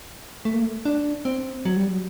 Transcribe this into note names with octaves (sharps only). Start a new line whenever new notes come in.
A3
A#3
A3
D4
C4
F#3
G3
F#3